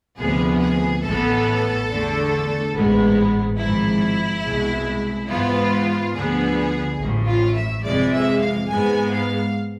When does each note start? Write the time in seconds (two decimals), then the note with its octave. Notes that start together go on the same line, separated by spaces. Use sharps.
0.18 D2 C3 F3 B3 G#4
0.61 G#4
1.03 A1 A2 E3 B3 A4
1.88 E2 D3 A3
2.74 A1 G#2 G#3 B3
3.58 G#1 G#2 F3 E4
4.43 C2 B2 G#3
5.28 G#2 E3 B3 F4
6.14 D2 D3 F3 B3 G#4
6.99 A1 A2 F3
7.27 F4
7.55 E5
7.83 F2 C3 E3 G#3 D5
8.12 E5
8.40 F5
8.69 G#2 G#3 B3 G#5
9.12 F5